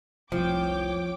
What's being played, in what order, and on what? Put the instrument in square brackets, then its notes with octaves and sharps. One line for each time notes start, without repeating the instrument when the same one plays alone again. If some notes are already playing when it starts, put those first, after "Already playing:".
[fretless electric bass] F1 C2 [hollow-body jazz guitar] F3 [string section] C#5 G5 D6